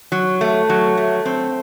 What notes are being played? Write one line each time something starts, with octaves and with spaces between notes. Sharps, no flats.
F#3
A3
F#3
A3
C4